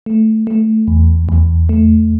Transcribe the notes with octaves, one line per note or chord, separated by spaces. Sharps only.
A3
A3
E2
E2
A3